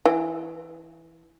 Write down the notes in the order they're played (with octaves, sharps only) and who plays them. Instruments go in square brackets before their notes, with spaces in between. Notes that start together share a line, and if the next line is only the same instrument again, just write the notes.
[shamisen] E3